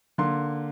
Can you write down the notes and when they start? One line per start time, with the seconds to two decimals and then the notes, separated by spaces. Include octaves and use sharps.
0.18 D3 A#3 C6